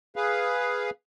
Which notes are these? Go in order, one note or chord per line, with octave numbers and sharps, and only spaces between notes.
G#4 B4 F5